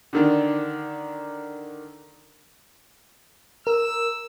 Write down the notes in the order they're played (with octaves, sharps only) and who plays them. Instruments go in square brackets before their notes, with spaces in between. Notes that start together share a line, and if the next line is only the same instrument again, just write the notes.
[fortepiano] D3 D#3 D4
[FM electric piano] A#4 [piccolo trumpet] E6